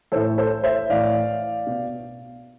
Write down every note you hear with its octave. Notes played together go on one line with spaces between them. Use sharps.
A2 E3 A4 C5
A4 C5
C5 E5
A2 E3 D5 F5
B2